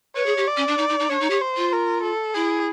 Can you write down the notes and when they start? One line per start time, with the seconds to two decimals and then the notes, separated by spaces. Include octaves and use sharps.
0.16 B4 C#5
0.26 G#4
0.37 G4
0.47 D5
0.57 C#4
0.68 D4
0.78 D#4
0.89 D#4
1.00 D#4
1.09 D4 C#5
1.21 D#4
1.30 G4
1.41 C5
1.57 F4
1.73 A#4
2.03 A4
2.35 E4 G#4